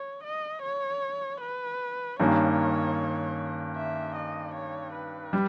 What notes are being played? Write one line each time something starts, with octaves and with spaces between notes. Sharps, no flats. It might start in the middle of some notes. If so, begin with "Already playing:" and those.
Already playing: C#5
D#5
C#5
B4
G2 D#3 A#3 C#4 C#5
E5
D#5
C#5
B4
G3